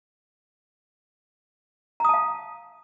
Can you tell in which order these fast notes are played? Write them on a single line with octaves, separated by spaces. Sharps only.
A#5 D#6 A5 F5